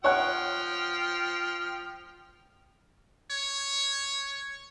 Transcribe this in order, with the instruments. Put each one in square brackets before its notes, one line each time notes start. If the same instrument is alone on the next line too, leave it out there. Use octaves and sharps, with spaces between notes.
[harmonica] F3 G5 F6 [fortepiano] C#5 F#5
[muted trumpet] C#5